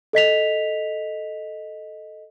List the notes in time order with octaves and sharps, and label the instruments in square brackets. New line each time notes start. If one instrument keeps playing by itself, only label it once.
[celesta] A4 D#5 B6 F7